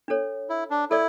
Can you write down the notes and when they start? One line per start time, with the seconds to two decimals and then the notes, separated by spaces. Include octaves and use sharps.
0.08 D4 A4 C#5
0.50 E4
0.70 D4
0.90 E4 A4 D5